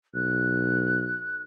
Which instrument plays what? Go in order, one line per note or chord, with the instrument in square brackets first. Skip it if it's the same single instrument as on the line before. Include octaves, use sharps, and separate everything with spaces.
[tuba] B1 [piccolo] F#6